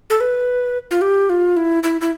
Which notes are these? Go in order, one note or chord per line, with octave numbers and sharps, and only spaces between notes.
A4
B4
F4
G4
F4
E4
E4
E4